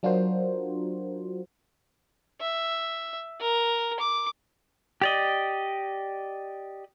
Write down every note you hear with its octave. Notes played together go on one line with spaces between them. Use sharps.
F#3 D4 F4 F#4 A#4 C5
E5
A#4
D6
G4 D5 D#5